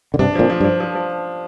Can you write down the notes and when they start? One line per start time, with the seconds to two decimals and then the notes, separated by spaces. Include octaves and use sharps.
0.14 D3
0.19 G2 C3 D4
0.35 F2 A#2 F3
0.50 F3
0.60 G2
0.64 F3
0.80 F3
0.95 F3